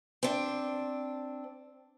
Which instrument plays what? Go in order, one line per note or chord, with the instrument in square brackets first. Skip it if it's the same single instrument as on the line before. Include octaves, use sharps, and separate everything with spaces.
[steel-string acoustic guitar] C4 D4